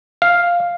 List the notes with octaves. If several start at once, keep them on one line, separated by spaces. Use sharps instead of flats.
F5